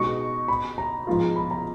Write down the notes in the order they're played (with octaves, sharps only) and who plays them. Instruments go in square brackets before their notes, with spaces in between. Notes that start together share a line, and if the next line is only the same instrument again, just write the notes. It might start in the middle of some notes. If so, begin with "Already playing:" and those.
Already playing: [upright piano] B2 G#3 B3 D#4 F#4 [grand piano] C#6
[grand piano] B5
A#5
[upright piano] G#2 F3 B3 F4
[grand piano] B5
A#5